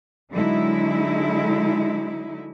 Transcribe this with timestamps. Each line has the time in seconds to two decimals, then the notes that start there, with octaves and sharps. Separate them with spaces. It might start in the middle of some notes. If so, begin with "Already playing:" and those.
0.32 D3 F#3 G#3 D#4 E4